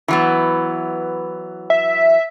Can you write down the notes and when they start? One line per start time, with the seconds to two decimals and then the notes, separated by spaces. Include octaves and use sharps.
0.08 E3 F#3 B3
1.70 E5